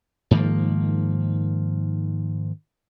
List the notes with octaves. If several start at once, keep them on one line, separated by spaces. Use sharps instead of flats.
G#2 D#3 F3 A#3